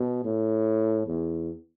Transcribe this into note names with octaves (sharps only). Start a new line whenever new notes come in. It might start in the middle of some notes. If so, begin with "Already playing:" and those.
Already playing: B2
A2
E2